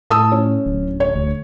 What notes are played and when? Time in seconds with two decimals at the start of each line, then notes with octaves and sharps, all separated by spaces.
0.10 A2 A5 D#6 E6
0.32 C#4
0.66 D1
1.00 C#5
1.15 D2